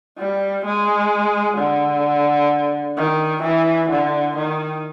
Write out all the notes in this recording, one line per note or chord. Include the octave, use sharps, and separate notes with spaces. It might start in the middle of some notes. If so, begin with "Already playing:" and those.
G3
G#3
D3
D#3
E3
D3
D#3